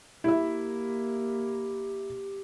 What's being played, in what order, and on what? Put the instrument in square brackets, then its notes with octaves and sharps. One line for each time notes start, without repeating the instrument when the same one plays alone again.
[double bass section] A#3 [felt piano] E4 E5 [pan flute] G4